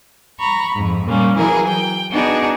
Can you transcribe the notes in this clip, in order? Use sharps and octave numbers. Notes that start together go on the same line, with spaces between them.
A#5 B5 C#6
F2 G#2
A#2 G3 A#3 C#4
E3 F#3 E4 G#4 A#4
G5
B3 D4 D#4 F#4 G#4